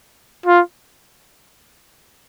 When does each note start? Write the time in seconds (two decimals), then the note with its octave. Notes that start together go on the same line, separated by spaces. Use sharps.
0.46 F4